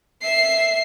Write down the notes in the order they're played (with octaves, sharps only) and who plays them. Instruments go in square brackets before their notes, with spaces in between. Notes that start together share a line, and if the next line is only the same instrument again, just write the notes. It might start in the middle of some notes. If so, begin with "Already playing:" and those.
[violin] E5 C7